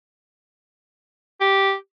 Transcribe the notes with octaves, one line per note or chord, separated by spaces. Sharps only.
G4